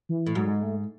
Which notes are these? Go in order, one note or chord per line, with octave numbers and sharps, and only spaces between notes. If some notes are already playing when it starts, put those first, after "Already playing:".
E3
A2
G#2 F#3
G#3
A3